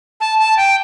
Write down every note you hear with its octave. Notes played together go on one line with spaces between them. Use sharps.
A5
A5
G5